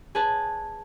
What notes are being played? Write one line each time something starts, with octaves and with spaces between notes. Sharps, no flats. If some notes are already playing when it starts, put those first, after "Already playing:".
G#4 B4 A5